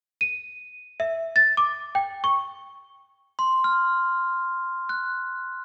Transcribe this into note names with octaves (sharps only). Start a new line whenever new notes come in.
D#7
E5
A6
D6
G5
C#6
C6
F6
F#6